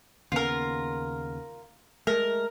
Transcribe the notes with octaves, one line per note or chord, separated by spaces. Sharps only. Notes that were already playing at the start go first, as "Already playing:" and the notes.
D#2 C#3 B3 F4 A#4
G#3 A3 A#4